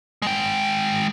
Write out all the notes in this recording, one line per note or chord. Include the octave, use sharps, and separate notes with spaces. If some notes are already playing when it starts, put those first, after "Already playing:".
G#3 G5